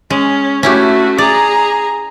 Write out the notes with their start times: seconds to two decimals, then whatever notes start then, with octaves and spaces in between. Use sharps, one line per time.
0.10 G#3 C#4
0.63 A3 C#4 E4 F#4 G4
1.18 G#4 D5 A#5